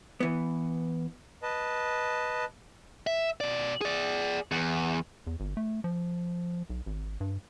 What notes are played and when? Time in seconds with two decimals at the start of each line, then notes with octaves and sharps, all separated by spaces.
0.20 E3 B3
1.43 B4 D#5 A5
3.07 E5
3.41 B2 D5
3.81 G#4 D5
4.51 E2
5.27 E2
5.40 G1
5.57 A3
5.84 F3
6.70 B1
6.86 G#1
7.20 G2